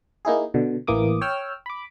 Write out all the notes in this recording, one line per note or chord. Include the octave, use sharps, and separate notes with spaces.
A#3 D#4 E4 G#4
B2 D3
A1 E3 A#3 D6 D#6
C#5 G5 E6 F6
B5 D6